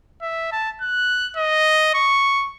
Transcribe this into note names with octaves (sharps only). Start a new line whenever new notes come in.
E5
A5
F#6
D#5
C#6